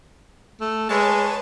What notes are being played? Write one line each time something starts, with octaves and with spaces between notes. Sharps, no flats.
A3
G#3 B4 C#5 A5